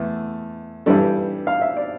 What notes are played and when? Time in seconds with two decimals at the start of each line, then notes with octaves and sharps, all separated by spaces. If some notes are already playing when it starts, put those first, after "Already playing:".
Already playing: E2 A3
0.86 G2 E3 G3 D4 A4
1.47 F5
1.61 E5
1.77 D5